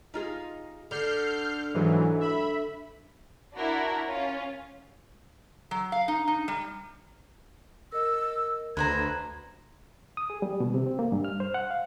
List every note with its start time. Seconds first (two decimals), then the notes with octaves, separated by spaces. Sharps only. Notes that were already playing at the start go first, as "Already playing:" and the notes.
0.14 D#4 F4 G#4
0.91 D3 F6 G6 C7
1.74 G#2 E3 F#3
2.20 E5 B5
3.54 D4 E4 F#4 A#4
4.06 C#4 F4
5.71 F#3
5.92 F5
6.08 D#4
6.28 D#4
6.48 G3
7.92 A#4 D#5 E6
8.77 D2 B4 C5 A#5 G#6
10.17 D#6
10.30 G#4
10.42 G3
10.60 B2
10.74 C3
10.86 C4
10.99 A#3
11.12 G2
11.24 F6
11.40 C5
11.54 F#5
11.71 F5